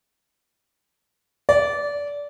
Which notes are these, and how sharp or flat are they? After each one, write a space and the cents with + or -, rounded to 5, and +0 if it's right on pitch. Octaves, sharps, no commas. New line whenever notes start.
D5 -20